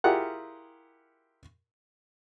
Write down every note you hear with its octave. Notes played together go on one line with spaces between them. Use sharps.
E4 F4 G4 G#4 A#4 F#5